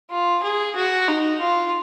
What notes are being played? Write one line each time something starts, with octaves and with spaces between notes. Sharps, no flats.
F4
G#4
F#4
D#4
F4